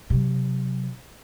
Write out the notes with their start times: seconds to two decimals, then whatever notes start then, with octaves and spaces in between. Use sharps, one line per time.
0.10 C3 F#3